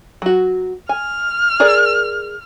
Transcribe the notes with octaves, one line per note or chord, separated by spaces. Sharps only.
F#3 F#4
G#5 F6
G#4 A#4 D5